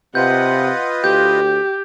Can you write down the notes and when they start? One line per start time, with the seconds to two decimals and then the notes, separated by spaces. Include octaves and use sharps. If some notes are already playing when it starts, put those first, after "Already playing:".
0.15 C3 F4 B4 D#5 F#5 G6
1.04 D2 G4 G6